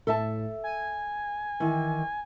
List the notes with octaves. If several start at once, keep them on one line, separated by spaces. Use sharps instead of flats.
A2 A4 E5 A5
G#5
D#3 E3